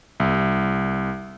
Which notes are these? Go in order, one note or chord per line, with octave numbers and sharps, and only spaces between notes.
C2